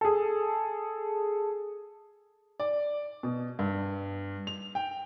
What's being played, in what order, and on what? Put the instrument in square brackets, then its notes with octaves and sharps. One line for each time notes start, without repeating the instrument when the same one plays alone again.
[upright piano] G#4 A4
D5
B2
G2
F7
G5